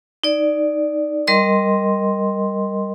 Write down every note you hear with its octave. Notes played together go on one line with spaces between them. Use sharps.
D#4 D5
G3 A#4 D#5 C6